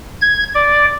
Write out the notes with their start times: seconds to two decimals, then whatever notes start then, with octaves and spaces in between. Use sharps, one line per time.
0.22 G#6
0.54 D5